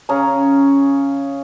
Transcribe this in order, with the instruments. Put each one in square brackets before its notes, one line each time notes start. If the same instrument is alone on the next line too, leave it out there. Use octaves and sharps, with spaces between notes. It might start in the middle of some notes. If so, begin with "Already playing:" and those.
[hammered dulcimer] C#3 C#4 G#4 A#5